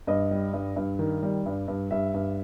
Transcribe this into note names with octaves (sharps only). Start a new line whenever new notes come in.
G2 D#5
G3
G2
G2
D#3
G3
G2
G2
G2 E5
G2